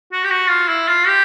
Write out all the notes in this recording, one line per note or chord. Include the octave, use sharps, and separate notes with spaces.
F#4
G4
F#4
F4
E4
F4
G4